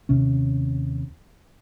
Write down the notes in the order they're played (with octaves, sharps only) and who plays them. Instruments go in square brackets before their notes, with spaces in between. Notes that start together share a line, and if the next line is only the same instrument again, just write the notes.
[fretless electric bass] D#2 C3 C#4